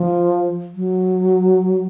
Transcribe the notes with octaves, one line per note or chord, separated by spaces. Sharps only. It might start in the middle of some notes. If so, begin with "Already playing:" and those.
Already playing: F3
F#3